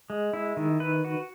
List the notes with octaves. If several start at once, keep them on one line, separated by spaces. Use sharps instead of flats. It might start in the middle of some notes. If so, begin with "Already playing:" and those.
G#3
E4
D#3
B4
F#4